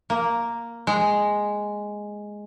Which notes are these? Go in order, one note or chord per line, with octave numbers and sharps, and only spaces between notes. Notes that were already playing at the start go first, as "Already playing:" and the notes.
A#3
G#3